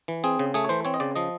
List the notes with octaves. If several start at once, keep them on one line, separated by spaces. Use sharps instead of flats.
E3
C4 G#4
C#3
A3 G#4
C#5
E3 C5
C4 C#5
D#5
C#3 D5
F3 D#5